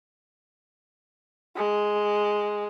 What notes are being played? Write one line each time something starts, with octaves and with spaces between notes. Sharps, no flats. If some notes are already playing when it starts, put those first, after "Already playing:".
G#3